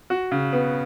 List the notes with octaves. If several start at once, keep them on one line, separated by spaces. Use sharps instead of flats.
F#4
C#3
B3